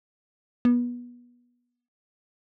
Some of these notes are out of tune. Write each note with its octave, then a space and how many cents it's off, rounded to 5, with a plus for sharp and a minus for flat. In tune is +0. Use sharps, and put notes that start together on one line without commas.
B3 -25